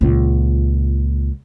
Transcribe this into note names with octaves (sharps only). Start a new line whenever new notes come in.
C#2 A#2